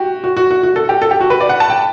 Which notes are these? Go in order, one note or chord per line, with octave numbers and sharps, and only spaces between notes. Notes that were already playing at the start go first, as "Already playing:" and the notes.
Already playing: F#4 G4
F#4
F#4
F#4
F#4
A4
G4
A4
G4
F#4
B4
D5
F#5
A5
G5